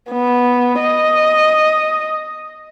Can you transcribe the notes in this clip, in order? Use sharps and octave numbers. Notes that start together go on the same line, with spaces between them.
B3
D#5